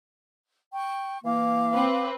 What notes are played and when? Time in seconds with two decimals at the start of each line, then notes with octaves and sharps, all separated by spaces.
0.73 G5 C#6
1.24 E3 A#3 F5 D6
1.73 C4 B4